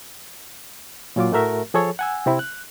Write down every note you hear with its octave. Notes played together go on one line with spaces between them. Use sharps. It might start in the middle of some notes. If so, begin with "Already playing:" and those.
A#2 F#3 F4 D6
A2 A3 F#4 A#4 E5
F3 G#4 A4 C#5
F#5 G#5 E6
C3 C4 E4
F#6